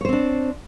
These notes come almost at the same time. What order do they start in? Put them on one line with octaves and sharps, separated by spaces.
C#5 C5 C4 D4